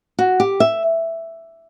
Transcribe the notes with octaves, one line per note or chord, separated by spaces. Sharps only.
F#4
G4
E5